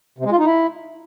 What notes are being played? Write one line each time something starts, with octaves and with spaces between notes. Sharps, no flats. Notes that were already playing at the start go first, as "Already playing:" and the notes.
C3
G#3
F4
D#4
E4